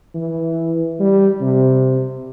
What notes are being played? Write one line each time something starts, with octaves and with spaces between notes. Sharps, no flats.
E3
G3
C3